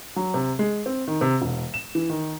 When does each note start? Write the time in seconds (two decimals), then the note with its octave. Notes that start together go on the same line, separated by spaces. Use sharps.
0.16 F#3
0.34 C3
0.59 G#3
0.86 C4
1.08 D#3
1.21 C3
1.41 E1
1.74 E7
1.95 E3
2.09 D#3